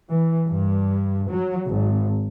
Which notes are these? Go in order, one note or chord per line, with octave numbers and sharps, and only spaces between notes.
E3
G2
F#3
G#1